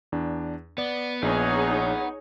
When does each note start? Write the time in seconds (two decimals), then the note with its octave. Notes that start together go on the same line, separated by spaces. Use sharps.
0.12 E2 D4
0.78 B3 D5
1.22 A#1 D#4 G#4 C#5